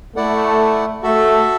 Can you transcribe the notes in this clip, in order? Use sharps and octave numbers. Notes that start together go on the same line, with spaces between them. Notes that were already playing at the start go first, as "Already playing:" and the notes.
A3 E4 D5 F#5
A3 F#4 A4 E5